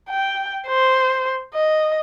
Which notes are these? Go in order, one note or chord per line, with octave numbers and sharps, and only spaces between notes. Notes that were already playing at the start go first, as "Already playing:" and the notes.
G5
C5
D#5